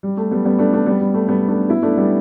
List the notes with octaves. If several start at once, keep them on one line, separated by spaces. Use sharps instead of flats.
G3
A3
G3 B3
G3 B3
A3 D4
A3 D4
G3 B3
G3
A3
G3 B3
A3 D4
B3 E4
A3 D4
G3 B3